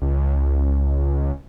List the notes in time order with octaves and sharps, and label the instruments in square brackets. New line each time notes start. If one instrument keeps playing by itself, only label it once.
[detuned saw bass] C#2